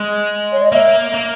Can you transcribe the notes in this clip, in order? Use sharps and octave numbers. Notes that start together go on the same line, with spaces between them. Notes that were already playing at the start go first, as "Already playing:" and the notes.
Already playing: G#3
C#5
D#5
A#3 E5
A#3